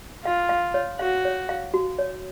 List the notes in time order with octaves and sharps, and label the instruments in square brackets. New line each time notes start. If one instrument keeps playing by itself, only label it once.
[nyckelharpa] F4 [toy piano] F5
[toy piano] F5
C#5
[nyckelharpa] F#4 [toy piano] F5
[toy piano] C#5
F5
F#4
C#5